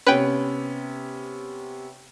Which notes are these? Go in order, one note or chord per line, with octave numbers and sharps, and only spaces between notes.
C3 B3 C#4 B4 G5